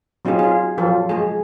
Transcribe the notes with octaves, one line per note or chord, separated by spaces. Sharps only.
F#3 C4 D#4 F4 G#4
F4 G#4
F3 F#3 F4 A4
G#3 G#4